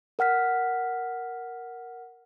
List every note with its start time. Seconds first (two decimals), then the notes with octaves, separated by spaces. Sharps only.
0.19 A#4 F#5 F6 B6